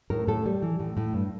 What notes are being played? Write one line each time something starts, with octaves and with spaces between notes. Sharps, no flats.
A2 A#4
A2 A4
G3
E3
A2
A2
G2